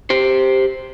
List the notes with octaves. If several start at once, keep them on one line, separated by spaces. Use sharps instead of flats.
G4 C5